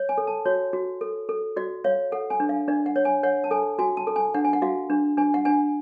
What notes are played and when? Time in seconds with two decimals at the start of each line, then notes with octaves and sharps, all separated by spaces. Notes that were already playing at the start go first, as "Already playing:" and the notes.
Already playing: C#5
0.09 G#5
0.18 A4
0.27 A5
0.45 F#4 C#5
0.73 F#4
1.01 A4
1.29 A4
1.57 F#4 D5
1.84 C#5 F5
2.12 A4 F#5
2.30 G#5
2.40 D4
2.49 F5
2.68 D4 D5
2.86 F#5
2.96 C#5
3.05 G#5
3.23 C#5 F#5
3.44 A5
3.51 A4 G#5
3.79 F#4 G#5
3.97 A5
4.07 A4
4.16 G#5
4.34 D4 F#5
4.45 G#5
4.53 F#5
4.62 F#4 F5
4.90 D4
5.17 D4 G#5
5.34 F#5
5.45 D4 G#5